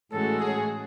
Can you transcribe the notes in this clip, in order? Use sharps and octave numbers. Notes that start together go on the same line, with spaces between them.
A2 E3 G#3 C#4 F#4 A4
G#4